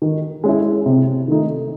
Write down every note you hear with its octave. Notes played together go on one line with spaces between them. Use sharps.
D#3
G#3 C#4 E4
C3
D#3 A3 D#4